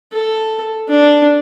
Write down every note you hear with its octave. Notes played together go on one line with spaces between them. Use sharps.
A4
D4